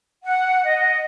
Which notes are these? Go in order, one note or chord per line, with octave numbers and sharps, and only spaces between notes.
F#5
D#5